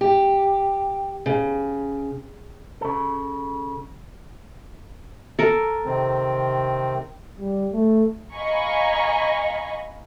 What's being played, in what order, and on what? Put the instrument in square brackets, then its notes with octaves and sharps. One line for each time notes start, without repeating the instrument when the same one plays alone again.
[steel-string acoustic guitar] G4
C#3
[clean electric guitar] C#3 A4
[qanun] A4 A#4
[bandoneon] C3 D#3 C4
[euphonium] G3
A3
[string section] D#5 F5 G#5 A#5 B5 C#6